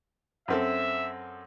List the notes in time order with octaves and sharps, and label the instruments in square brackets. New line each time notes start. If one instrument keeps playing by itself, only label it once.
[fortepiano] F#2 C4 A4 [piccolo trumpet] E5